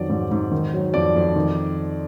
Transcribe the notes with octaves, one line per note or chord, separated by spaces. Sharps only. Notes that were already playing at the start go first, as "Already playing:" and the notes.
Already playing: F2 D#3 F#3 D5
G#2
G#2
D#3
F#3
F2 D5
F2
D#3